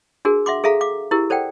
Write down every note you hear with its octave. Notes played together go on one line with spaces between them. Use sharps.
D4 F#4 G#4 A#4
E5 F#5 C6 D6
G#4 A4 E5 F5 A#5
F5 D6
E4 G4 A#4
A4 C5 D5 F#5 G5